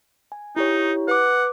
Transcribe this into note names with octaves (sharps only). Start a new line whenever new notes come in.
G#5
D#4 E4 G4 C#5
B4 F#5 D6